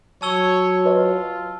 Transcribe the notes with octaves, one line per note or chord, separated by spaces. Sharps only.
F#3 C#5 A5 E6 G7
F4 B4 C#5 D#5